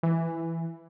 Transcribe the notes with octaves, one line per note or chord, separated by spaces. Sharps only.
E3